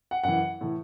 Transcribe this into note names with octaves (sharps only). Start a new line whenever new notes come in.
F#5
F#2 E3 F#5
A2 E3